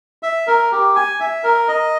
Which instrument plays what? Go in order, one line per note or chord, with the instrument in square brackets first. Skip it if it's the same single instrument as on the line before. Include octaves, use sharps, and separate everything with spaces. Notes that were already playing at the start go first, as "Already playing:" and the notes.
[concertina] E5
A#4
G4
G#5
E5
A#4
D#5